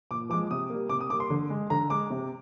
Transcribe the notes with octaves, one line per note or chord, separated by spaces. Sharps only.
A#2 D6
F3 G#3 D6
C3 D#6
G3 A#3
C3 D6
D#6
G3 A#3 D6
C6
D3
G#3
D3 A#5
G#3 D6
C3